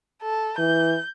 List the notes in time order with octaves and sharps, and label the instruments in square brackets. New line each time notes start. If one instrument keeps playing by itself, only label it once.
[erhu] A4
[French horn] E3 [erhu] G6